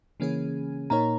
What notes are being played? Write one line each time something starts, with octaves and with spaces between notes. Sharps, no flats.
C#3 E3 A#3 C#4 G#4
A#2 A#3 D#4 A#4 C#5 A#5